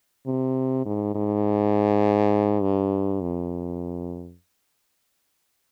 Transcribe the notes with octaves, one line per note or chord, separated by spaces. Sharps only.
C3
G#2
G#2
G2
F2